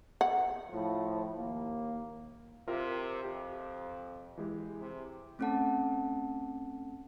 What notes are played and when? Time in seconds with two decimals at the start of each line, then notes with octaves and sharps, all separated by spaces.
0.21 F#5
0.70 A2 F3
1.37 D#2 A#3
2.68 C3 F4 A#4 E5
3.24 F2 G4
4.38 E3 G#3 G4
4.81 C3
5.39 A3 C4 C#4 A4 F#5 A5